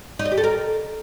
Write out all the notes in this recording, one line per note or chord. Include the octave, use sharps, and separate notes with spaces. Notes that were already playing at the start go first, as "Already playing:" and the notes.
D#4
D#5
G4
A4
A#4